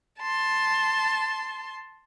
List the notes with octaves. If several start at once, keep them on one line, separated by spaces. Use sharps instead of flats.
A5 C6